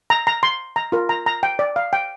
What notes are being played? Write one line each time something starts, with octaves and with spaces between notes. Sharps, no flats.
A#5
A#5
C6
A#5
F4 A#4
A#5
A#5
G5
D5
F5
G5